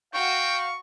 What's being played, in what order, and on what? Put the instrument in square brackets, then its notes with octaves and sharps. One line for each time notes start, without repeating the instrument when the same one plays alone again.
[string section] F#4 [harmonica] F5 [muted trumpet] G5 [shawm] C#6